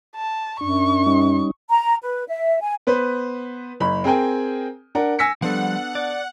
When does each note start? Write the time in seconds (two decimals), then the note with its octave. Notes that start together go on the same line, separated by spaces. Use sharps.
0.16 A5
0.61 F#2 D4 C#6
1.06 G3 C#4 D#4
1.70 A#5
2.03 B4
2.28 E5
2.61 G#5
2.87 B3 B4 C5
3.80 F#1 B5
4.04 C4 G#4 A#4 G5 G#5
4.95 D4 A#4 F#5
5.19 G#5 E6 A#6 B6 C#7
5.42 F3 G3 B3 D4 A4 F#5
5.95 D5